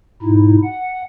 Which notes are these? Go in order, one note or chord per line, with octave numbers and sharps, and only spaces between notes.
G#2 B2 D#4 E4
F#5